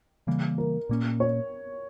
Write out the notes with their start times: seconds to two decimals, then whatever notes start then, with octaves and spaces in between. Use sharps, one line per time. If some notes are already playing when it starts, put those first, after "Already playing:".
0.27 C#3 E3 G3 A#3
0.58 A#4
0.89 A#2 A#3 C#4
1.20 C#5